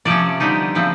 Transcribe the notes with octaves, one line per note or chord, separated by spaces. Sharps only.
C3 F3 A3 C#4 D5
D3 G3 B3 D#4
C#3 F3 A3 C4